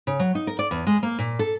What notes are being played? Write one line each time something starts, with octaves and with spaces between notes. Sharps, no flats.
C#3
F#3
D#4
A#4
D5
E2
G#3
A#3
A#2
A4